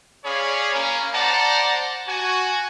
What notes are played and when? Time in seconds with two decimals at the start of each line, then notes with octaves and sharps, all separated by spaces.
0.25 C#4 G#4 C#5 D5 F5 B5
0.73 A#3 C#4
1.13 C5 D5 F#5 A5 A#5
2.08 F#4 G#5